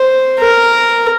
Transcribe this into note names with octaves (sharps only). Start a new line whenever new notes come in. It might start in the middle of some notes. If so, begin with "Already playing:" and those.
Already playing: C5
A#4